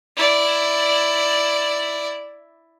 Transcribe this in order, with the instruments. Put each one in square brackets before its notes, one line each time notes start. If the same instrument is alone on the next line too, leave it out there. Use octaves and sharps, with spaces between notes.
[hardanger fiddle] E4 D5